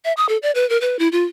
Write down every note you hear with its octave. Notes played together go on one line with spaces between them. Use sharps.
E5
D#6
A4
D5
B4
A#4
B4
E4
F4